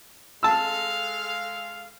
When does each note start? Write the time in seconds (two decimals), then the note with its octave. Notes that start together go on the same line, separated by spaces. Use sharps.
0.43 G#3 A4 F5 A5 E6